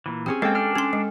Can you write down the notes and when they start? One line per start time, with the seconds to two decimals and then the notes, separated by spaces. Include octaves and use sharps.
0.06 A#2 E3
0.26 C4 C#4 G4 G#4
0.42 G#3 A#3 C4 A4 G5
0.55 D4 F6
0.76 C#4 A4 C6
0.93 G#3